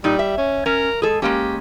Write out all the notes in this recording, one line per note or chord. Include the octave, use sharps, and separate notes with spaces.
A#2 G3 D#4
E5
C#4
C#4 A#4
G#3 G#4 A4
G#3 A#3 C#4 G4